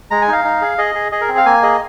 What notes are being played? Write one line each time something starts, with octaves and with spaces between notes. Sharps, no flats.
G#3 A#5
G#5
D#4 F5
D#4
G#4
G#4 D#5
G#4
G#4 D#5
A#4
C4
F5
A#3 G#5
G#4 D#5